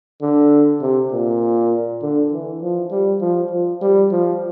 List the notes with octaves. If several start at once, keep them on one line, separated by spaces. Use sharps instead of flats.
D3
C3
A#2
D3
E3
F3
G3
F3
F3
G3
F3